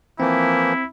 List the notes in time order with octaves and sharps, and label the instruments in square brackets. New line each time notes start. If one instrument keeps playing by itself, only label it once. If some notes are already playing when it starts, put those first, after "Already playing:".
[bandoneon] E3 F3 A#3 [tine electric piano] C4 [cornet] E4